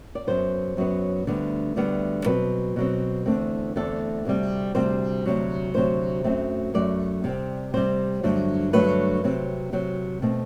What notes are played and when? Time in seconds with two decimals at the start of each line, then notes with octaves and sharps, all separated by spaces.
0.15 D5
0.27 F#2 F#3 B3 C5
0.77 F#2 F#3 B3
1.27 D2 D3 G3 B3
1.76 D2 D3 G3 B3
2.26 B2 F#3 C4 B4
2.76 B2 F#3 C4
3.26 E2 D3 A3 C4
3.76 E2 D3 A3 C4 A4
4.25 D2 C3 G3 C4
4.75 D2 C3 G3 C4 C5
5.26 D2 C3 F#3
5.74 D2 C3 F#3 C5
6.24 F#2 F#3 A3 C4
6.74 F#2 F#3 A3 D5
7.24 C3 G3 C4
7.74 C3 G3 C4 C5
8.23 G2 D3 F#3 A3
8.73 G2 D3 F#3 A3 B4
9.24 C3 F#3 C4
9.73 C3 F#3 C4
10.22 B2 A3 C4